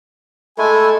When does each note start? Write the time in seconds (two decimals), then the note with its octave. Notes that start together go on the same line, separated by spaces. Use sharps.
0.58 G#3 A3 E4 A4 G#5